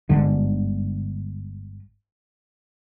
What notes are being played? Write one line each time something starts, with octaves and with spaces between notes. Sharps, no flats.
G1 G#2 D3